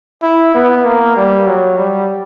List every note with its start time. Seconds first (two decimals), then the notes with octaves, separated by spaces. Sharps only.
0.22 E4
0.54 B3
0.85 A#3
1.16 G3
1.46 F#3
1.78 G3